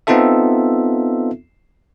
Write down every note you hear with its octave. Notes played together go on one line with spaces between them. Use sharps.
B3 C4 D#4 F4 A4 E5